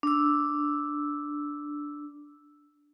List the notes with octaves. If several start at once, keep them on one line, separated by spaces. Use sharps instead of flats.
D4 E6